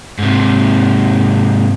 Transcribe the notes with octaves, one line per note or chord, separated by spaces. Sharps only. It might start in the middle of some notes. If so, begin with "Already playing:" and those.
G#2 C3